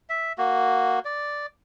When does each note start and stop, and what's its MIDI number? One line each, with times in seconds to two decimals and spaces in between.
0.09 0.33 76
0.38 0.99 58
0.38 0.99 66
1.05 1.46 74